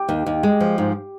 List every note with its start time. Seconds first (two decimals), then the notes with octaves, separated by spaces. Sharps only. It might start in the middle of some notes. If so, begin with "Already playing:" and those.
Already playing: G4
0.09 D#2
0.26 D#2
0.43 G#3
0.61 F3
0.78 G#2